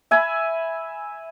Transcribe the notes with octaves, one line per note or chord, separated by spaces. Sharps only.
E5 G#5 B5